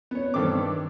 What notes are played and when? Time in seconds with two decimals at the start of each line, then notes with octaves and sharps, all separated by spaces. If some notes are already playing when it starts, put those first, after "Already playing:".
0.11 B3 C#5
0.34 G2 D#3 C4 A4 D6